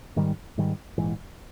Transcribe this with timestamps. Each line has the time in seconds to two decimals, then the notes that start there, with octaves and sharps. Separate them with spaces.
0.16 G#2 D#3 G3
0.58 G#2 D#3 G3
0.98 A#1 G#2 E3